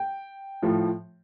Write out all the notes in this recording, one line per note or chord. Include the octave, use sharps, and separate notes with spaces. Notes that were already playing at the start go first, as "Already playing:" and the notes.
Already playing: G5
A2 F3